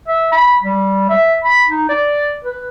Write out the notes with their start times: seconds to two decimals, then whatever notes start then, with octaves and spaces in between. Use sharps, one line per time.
0.08 E5
0.32 B5
0.63 G3
1.09 E5
1.44 B5
1.69 D#4
1.89 D5
2.44 B4